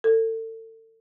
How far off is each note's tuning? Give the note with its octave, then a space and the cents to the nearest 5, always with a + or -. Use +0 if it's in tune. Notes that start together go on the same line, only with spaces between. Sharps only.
A4 +35